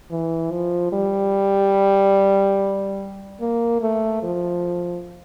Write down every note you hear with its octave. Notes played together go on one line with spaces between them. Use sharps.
E3
F3
G3
A#3
A3
F3